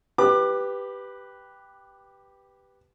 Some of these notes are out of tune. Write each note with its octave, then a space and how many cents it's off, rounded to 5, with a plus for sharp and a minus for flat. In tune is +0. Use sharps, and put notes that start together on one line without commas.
G4 +0 B4 +0 D6 +25